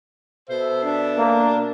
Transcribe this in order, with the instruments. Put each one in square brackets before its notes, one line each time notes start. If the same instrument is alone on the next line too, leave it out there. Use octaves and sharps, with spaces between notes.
[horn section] B2 A4 E5 [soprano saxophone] C5
[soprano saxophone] D4
[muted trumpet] A#3